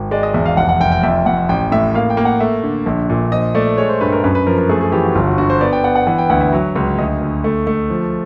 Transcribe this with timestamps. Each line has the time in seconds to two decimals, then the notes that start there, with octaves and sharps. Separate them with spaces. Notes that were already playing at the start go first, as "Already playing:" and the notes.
Already playing: G#1
0.11 G#3 D5
0.23 D#5
0.34 E2 E5
0.45 F5
0.57 F1 F#5
0.69 F#5
0.80 F1 G5
0.92 G5
1.03 F2 E5
1.26 F2 F#5
1.49 A1 G5
1.72 A2 E5
1.94 A#3 F5
2.10 G5
2.17 A#3
2.25 F#5
2.40 A3 E5
2.63 D3
2.86 A#1
3.09 A#2
3.32 F3 D#5
3.55 A3 D5
3.78 G#3 C#5
3.89 C5
4.01 G2 B4
4.12 A#4
4.24 F#2 B4
4.35 B4
4.47 F3 A#4
4.58 A#4
4.69 A3 G#4
4.81 G#4
4.92 E3 G4
5.04 F#4
5.15 G1 F4
5.27 F#4
5.38 D3 F#4
5.50 C5
5.61 B3 D5
5.73 G5
5.84 B3 F#5
5.96 F#5
6.07 E3 F#5
6.18 G5
6.30 D2 F#5
6.41 E5
6.53 F#3
6.76 C#2
6.98 D2 D#5
7.21 D2
7.44 A3
7.67 A3
7.90 F3